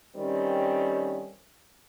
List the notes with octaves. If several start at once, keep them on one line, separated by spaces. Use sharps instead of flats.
D3 D#3 G3 C4 C#4